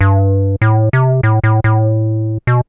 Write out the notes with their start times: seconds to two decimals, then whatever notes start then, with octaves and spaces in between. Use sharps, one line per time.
0.01 G2
0.62 A2
0.93 C3
1.23 A2
1.44 A2
1.64 A2
2.47 B2